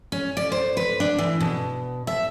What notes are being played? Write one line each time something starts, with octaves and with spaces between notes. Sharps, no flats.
C#4
D5
C5
B4
D4
E3
B2
E5